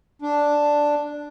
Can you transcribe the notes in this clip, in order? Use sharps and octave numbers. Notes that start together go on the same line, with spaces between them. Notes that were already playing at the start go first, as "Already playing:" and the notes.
D4